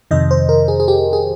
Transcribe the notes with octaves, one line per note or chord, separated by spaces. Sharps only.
F2 C3 D#3 D#5
C5
A#4
G#4
G#4
G4
G#4